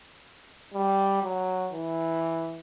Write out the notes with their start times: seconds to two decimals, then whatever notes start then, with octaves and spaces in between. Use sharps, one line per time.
0.74 G3
1.23 F#3
1.73 E3